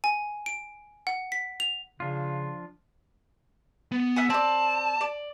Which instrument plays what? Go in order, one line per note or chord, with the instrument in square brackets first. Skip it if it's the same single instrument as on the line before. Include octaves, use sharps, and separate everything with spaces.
[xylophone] G#5
D7
F#5
B6
F7
[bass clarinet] C#3 [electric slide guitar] F3 D4 F4
[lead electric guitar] B3
[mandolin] E5 F#5 G#5
[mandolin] C4 D5 [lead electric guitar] A5
[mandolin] D5